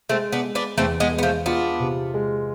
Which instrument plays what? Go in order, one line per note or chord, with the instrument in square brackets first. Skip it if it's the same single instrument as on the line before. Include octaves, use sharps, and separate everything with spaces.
[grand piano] G#3 [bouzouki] A3 C4
[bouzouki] B3 D4
[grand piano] G#3
[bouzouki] B3 D4
[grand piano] E2 [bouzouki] A3 C4
[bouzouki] G#3 B3
[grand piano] G#3
[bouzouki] B3
F3 A3
[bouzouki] B3 D4 [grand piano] F4
[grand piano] C3
G#3